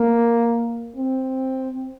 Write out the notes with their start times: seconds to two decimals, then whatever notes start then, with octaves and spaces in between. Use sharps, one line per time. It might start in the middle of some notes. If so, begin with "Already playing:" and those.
Already playing: A#3
0.96 C4